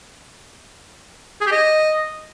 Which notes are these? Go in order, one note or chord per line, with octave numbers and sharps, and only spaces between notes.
G#4
G4
D#5